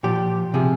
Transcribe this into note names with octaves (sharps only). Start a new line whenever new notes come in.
A#2 F3 G4
C3 F3 G#4